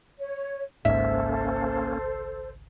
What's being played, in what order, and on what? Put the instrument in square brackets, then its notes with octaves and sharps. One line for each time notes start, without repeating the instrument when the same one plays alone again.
[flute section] C#5
[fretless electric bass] G#1 C#2 G#2 [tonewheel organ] A#3 C#4 [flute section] A4 C5 [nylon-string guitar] E5